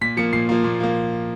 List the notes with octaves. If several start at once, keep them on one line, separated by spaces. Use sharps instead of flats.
A#2 B6
F3 A#3 C#7
A#2 C7
F3 A#3
A#2
F3 A#3